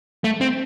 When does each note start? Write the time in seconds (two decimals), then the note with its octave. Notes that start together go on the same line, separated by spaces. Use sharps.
0.24 A3
0.41 C4